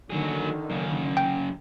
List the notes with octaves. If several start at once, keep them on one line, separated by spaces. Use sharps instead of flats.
D3 D#3 F#3 G#4
F#2 C#3
G5